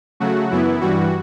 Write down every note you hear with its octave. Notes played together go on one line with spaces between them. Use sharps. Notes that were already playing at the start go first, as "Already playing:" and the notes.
C#3 F#3 A3 F#4
F#2 E3 B3 E4
G2 E3 G3 F#4